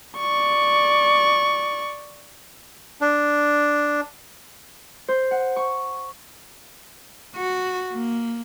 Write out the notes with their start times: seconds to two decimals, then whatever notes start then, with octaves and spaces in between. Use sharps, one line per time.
0.18 D5 C#6
3.01 D4
5.08 C5
5.31 F#5
5.56 C#6
7.36 F#4
7.93 A#3